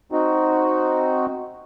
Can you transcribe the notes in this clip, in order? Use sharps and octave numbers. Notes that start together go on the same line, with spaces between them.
C4 D#4 F#4